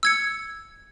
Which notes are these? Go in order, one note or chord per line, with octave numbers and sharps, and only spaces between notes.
E6 G#6 C#7